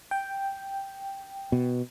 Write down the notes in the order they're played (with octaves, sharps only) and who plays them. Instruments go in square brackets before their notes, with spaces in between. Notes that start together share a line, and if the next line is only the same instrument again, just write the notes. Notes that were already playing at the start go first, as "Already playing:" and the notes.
[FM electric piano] G5
[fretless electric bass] B2